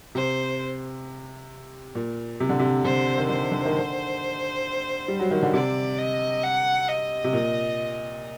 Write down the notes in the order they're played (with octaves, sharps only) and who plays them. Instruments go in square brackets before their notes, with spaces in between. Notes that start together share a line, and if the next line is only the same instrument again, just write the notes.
[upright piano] C3 [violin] C5
[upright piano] A#2
C3
D3
C3
[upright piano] D3 [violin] C5
[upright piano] D#3
[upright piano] D3 [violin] C5
[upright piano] D3
D#3
D3
G3
F#3
D#3
D3
[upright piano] C3 [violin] D5
[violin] D#5
F#5
D#5
[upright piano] C3
A#2